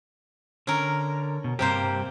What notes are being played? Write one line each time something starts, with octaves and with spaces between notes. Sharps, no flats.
D3 C#4 A#4
B2
G2 C3 G3 A#3 G4 C5